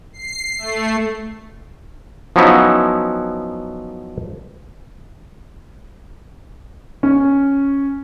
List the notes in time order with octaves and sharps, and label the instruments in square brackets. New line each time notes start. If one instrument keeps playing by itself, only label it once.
[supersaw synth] C7
A3
[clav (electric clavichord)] F3 F#3 B3 C#4 D#4 E4
[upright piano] C#4